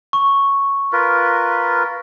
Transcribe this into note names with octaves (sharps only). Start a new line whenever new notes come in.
C#6
F4 A#4 B4